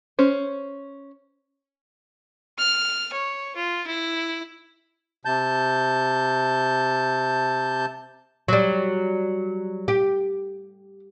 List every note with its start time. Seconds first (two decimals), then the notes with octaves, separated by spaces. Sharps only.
0.19 C#4 C5
2.58 F6
3.13 C#5
3.56 F4
3.87 E4
5.25 C3 A5 G6
8.48 F#3 G3
9.88 G4